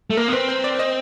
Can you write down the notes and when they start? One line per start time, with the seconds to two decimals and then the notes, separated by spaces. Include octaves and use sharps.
0.10 A3
0.17 A#3 A#4
0.28 B3
0.32 C4 B4
0.49 C5
0.64 D5
0.79 D#5